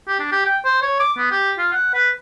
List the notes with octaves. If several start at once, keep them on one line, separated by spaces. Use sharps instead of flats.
G4
D4
G4
G5
C5
C#5
D6
B3
G4
F4
F#5
B4